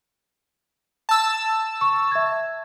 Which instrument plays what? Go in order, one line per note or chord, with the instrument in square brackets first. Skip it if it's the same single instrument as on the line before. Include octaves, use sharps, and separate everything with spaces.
[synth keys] A5 E6
[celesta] C#6
E5 G#6